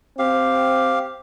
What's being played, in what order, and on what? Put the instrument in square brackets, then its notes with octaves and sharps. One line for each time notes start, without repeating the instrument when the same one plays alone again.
[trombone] C4 [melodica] G4 F5